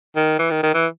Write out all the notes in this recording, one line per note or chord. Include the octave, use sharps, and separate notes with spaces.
D#3
E3
D#3
D#3
E3